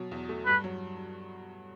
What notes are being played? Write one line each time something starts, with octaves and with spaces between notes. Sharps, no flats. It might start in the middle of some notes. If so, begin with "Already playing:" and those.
Already playing: B2 F#3
E2
A3
G2 B4
F#3